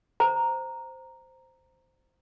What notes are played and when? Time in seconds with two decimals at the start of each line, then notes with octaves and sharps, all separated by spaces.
0.20 C5 A#5